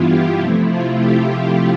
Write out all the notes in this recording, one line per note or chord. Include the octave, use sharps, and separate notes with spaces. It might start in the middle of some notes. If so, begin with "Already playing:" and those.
Already playing: G2 E3 B3 E4 F4
G4
C3 F3 A3 E4
F4
G4